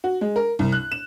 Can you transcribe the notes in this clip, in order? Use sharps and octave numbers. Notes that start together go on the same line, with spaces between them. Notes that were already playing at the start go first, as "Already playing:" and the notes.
F#4
G#3
A#4
C2
F#6
E7